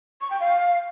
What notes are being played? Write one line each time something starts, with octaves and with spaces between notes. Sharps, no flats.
C#6
G5
F5